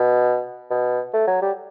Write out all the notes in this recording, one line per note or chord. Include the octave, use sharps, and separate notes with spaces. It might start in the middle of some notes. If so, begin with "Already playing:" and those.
Already playing: B2
B2
A3
F#3
G3